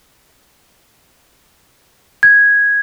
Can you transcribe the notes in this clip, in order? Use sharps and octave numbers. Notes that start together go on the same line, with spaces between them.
G#6